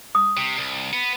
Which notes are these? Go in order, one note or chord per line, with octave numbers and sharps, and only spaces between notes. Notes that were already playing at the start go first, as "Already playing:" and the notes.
D#6
C3
C2
B3